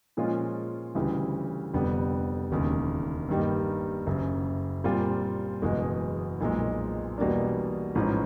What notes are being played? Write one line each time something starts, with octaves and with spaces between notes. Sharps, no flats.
A#2 F3 G#3 C#4 F4
D2 C#3 E3 G3
F1 F2 D3 G3 B3
E1 D#2 C#3
G2 D#3 G3 A#3
F#1 F#2 C#3
A#2 G3 C4 F4
F#1 E2 B2 G#3
B1 A#2 F3 G#3
E2 B2 G3 A#3 D4
A1 G#2 F3 G#3 C#4